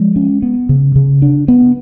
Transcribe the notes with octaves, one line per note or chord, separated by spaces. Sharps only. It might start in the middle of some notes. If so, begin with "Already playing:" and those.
Already playing: F3 G#3
C#4
B3
C#3
C#3
D4
B3